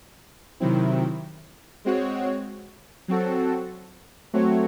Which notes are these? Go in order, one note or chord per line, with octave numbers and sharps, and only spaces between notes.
C3 D#3 F#3 C4 E4
G#3 C4 F#4 C#5
F#3 C4 F#4 A4
F#3 A3 C4 F#4 C#5